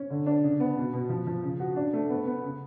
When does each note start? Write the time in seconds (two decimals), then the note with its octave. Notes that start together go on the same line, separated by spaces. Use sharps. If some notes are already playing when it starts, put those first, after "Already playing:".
Already playing: C#4
0.10 D3
0.26 D4
0.44 C#3
0.60 B3
0.77 B2
0.94 B2
1.09 F3
1.27 F3
1.44 C#3
1.60 F#4
1.76 D4
1.93 A3
2.10 B3
2.26 B3
2.44 C#3